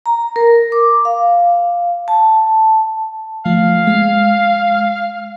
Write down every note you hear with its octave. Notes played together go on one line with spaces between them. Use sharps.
A#5
A#4
D6
F5
A5
F3 A3 F5
G#3